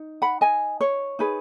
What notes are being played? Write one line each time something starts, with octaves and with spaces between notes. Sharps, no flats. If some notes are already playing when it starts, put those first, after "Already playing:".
Already playing: D#4
F#5 B5
D#5 G#5
C#5
D#4 G#4 B4